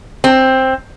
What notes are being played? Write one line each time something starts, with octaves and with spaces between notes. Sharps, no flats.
C4